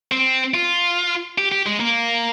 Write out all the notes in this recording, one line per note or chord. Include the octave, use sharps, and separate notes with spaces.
C4
F4
G4
G4
G#3
A#3